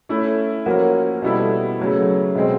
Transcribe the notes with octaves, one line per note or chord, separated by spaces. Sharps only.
A3 C#4 E4
F3 A#3 C#4 F#4 A#4
B2 G3 B3 E4 A4
C#3 F#3 A3
B2 G#3 C4